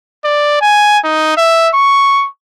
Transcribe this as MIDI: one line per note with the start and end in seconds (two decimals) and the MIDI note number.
0.25 0.59 74
0.61 0.99 80
1.05 1.37 63
1.37 1.69 76
1.74 2.27 85